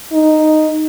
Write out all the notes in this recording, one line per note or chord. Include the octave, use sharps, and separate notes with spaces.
D#4